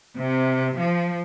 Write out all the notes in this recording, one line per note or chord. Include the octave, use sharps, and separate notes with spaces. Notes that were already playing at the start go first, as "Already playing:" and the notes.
C3
F3